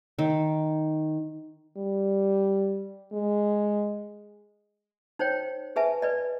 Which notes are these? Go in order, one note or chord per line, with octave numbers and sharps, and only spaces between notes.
D#3
G3
G#3
D#4 C5 C#5 G5
G#4 B4 E5 G#5 A5
B4 D5 D#5